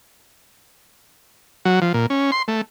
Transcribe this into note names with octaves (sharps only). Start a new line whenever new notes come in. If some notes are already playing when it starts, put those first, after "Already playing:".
F#3
F3
A#2
C#4
C6
A3